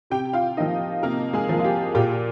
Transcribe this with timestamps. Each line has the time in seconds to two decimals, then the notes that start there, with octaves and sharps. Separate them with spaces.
0.10 C3 G4 G5
0.33 F4 F5
0.57 A#3 D#4 D#5
0.60 F3
1.03 C3 A#3 A#4
1.33 G#3 G#4
1.49 F3 A#3
1.59 F4
1.64 G4
1.95 A#2 G4